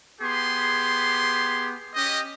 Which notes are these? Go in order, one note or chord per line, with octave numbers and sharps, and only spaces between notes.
B3 G4 G#4 C6
C#4 G4 D#5